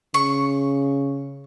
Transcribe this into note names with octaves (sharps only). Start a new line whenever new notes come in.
C#3 C#6